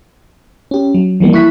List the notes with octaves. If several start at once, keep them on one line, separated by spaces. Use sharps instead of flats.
C#4 G4
F#3
E3 F3 G3 A#3 B3
E4 C#6 F#6 B6